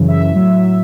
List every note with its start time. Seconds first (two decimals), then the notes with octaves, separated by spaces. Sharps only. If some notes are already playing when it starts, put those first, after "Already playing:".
Already playing: F#2 C#3 E3
0.08 E5
0.32 A2 F#3